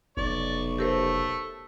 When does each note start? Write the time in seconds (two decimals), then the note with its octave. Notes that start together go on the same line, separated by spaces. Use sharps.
0.17 F1 B1 D5 C#6
0.78 A3 G4 A#4 C5